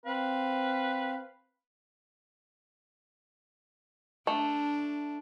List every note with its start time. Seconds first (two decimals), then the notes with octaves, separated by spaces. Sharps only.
0.06 C4 B4 F5
4.27 A3 D4